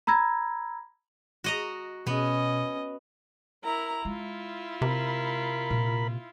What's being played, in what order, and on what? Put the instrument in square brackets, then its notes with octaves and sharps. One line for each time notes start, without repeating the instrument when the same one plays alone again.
[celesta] A#5 B5 E6 G#6 A#6
[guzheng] F#4 D#5 A#5
[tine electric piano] B2 [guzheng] B3 [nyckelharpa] C#4 D#5
[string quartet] E4 A#4 A#5
[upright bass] G#3 [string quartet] E4 F4
[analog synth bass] C3 [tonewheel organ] A#4 B5
[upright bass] A#2